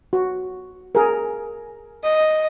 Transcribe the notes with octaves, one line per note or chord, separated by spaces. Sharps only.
F#4
G#4 A#4
D#5